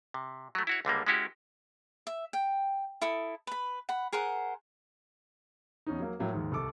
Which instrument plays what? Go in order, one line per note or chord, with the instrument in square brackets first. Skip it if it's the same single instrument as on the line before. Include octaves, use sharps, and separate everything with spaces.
[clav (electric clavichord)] C3
F#3 A3
E4 F#4 C#5
C#2 D3 G3 A#3
G#3 C#4 E4 F#4 G4
[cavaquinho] E5
G5
E4 A4 D#6
B4 B5
F#5 B5
G#4 A#4 C5 F#5
[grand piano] E2 C#4 D#4
F#3 A#3
A2 F#3 A#3
D#2 G#2
C2 A4 D6